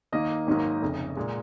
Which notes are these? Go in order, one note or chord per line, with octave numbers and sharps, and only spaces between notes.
D#2 D#3 A#3 D#5
G#1 G#2 D#3 F#3 A#3
F1 F2 C#3
A#2 G#3